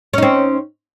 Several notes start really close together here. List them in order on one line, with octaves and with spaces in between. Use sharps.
C#4 D#4 C4